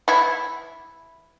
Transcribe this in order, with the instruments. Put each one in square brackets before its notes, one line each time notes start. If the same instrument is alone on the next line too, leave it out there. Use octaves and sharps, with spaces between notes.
[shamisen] E3 E4